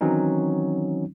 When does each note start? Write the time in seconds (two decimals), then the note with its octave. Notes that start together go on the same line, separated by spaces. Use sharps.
0.01 D#3 E3 F#3 C4 C#4 D#4